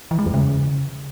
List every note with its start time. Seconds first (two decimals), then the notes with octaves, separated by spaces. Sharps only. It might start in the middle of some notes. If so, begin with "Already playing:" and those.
0.11 E3
0.19 G#3
0.26 F2
0.34 C#3